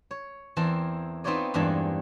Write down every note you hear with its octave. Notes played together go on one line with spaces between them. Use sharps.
C#5
E2 E3 C4 A#4 A5
B3 C4 D#4 F4 C#5 D5
E2 G2 G#3 A#3 D4 A5